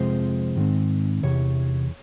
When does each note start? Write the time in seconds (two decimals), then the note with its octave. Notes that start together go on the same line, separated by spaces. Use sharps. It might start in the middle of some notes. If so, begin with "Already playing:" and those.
Already playing: F2 C3 F3 G#3 C4 C5
0.56 G#2 D#3 G#3 C4
1.23 E2 C3 E3 C#5